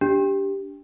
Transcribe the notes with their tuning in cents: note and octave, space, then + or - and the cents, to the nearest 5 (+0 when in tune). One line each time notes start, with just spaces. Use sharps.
D4 -25 G4 +0